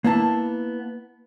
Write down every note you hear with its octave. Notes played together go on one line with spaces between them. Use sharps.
A#3 B3 E4 A5